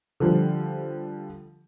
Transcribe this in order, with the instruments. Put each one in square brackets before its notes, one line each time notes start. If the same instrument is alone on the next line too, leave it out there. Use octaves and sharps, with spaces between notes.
[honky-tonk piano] D3 F3 G3